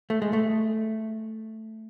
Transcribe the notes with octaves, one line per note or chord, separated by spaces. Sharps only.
A3
G#3
A3